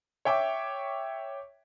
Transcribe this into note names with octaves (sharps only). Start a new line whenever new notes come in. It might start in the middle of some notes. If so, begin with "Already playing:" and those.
C#5 E5 G5 D6